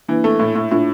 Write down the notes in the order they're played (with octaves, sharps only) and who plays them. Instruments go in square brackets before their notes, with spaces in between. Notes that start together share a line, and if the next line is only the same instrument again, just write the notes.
[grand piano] E3 [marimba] A#3 D4
[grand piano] A3
A2
A2
[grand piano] A2 [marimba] D4 F4